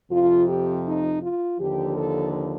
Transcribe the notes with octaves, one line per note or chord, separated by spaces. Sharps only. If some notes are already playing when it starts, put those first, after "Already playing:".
F2 C3 F3 F4
G4
D#4
F4
D#2 D3 F3 G4
A4